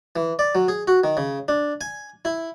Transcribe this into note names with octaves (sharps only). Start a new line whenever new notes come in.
E3
D5
F#3
G#4
F#4
D#3
C#3
D4
G#5
E4